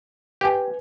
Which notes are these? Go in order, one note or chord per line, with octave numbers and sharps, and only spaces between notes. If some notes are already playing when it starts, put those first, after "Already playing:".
G4 B4 G#5